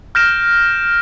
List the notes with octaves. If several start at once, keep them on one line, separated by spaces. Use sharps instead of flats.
F6 G6 A#6 D7 E7